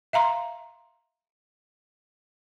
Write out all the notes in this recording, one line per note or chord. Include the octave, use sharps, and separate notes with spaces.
E5 F5 A#5 C6